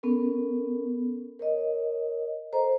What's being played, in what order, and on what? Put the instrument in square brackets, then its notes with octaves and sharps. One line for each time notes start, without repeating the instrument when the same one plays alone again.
[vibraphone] B3 C#4 A4 A#4
A#4 C#5 D#5
A4 C5 D#5 A#5